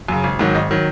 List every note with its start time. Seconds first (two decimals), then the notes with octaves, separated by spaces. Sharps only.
0.08 F#2 C#3
0.24 G#1
0.39 G#2 D#3 F#3
0.54 G#1 D#5
0.71 D#3 F#3